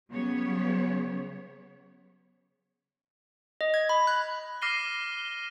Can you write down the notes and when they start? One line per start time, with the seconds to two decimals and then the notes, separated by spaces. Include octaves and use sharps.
0.11 C#3 F#3 G3 B3 C#5
3.61 D#5
3.74 G#6
3.89 B5
4.07 F#6
4.62 D6 F6 A#6 C7 D#7 G7